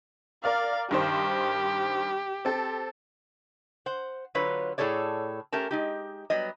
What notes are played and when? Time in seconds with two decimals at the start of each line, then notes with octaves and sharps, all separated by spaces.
0.44 A#4 D5 F5 F6
0.91 G2 D#3 G4 C5
2.45 C4 A4
3.86 C5 F#5
4.35 D3 F#3 F4 B4 C#5
4.78 A2 G#4 A4 C#5 D5
5.52 A3 C#4 G4 A#4 A5
5.71 G#3 D#4 G4
6.30 F#3 G3 B3 D#5